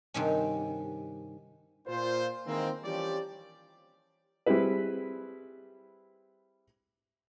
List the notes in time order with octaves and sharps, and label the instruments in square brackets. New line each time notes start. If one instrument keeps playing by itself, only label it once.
[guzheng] G2 C3 D#3 C#4
[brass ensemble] A#2 F4 C5
D#3 E3 G#3 A#3 C4
E3 F3 G3 C#4 G4 D5
[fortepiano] G3 C4 E4 G#4 B4